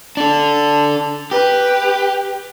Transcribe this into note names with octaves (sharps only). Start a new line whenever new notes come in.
D4 A4
G4 B4